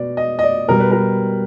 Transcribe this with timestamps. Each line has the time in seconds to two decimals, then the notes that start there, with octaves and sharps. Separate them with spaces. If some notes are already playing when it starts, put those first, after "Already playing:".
Already playing: B2 D5
0.17 D#5
0.39 D#5
0.43 D5
0.68 B2 G3 A#4
0.80 B4
0.92 A#4